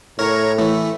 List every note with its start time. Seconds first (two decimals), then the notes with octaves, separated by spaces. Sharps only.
0.19 A2 A#4 C#5 A#5 C#6
0.59 E3 A3